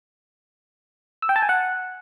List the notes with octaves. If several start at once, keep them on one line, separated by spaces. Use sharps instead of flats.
E6
G5
A5
G#5
F#5